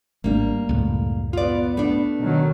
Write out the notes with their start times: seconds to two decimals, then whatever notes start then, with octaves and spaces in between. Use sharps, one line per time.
0.24 G#1 G3 A3 A#3 D4
0.69 C#2 F#2 A2
1.33 B3 F4 D5
1.77 A3 D4
2.18 B2 D#3 F#3